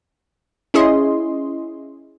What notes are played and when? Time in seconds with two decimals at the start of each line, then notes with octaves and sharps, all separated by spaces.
0.74 C#4 E4 G#4 D#5 C6